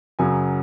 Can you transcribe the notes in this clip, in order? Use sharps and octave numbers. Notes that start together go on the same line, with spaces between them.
F#2 C#3 F#3 G#5